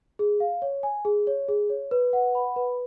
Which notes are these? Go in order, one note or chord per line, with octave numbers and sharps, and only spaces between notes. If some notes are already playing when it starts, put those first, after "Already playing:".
G#4
F5
C#5
G#5
G#4
C#5
G#4
C#5
B4
F#5
B5
B4